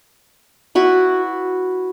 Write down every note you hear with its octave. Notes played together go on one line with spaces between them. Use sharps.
E4 F#4 B4